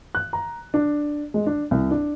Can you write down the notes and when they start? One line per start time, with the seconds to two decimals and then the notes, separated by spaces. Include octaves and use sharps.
0.15 F#6
0.33 A#5
0.74 D4
1.34 G#3
1.46 D4
1.71 C2
1.91 D4